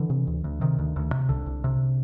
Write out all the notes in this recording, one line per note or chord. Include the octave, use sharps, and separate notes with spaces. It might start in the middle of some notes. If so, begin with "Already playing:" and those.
Already playing: D3 E3
C3
D2
D2
C3 D#3
D2
D2
C3
C2 D3
C2
C3